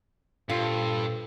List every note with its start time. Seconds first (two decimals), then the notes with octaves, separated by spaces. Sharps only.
0.50 G2 A#2 F4 A4 C5